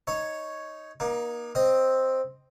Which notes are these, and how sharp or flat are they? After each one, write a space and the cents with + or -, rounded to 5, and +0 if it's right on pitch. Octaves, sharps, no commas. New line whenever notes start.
D#4 +5 C#5 +0
A#3 +35 D#4 +0
C4 +0 D#5 +0